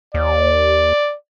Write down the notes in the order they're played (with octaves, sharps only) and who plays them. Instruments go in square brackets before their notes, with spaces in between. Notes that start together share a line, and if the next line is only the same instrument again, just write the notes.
[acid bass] D#2 [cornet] D5